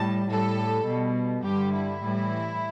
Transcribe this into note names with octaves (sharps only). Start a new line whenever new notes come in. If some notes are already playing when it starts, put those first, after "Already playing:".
Already playing: A2 G3 A5
A2 G3 A4
B2 G3
G2 D3 G3 G4
E4
A2 E3 G3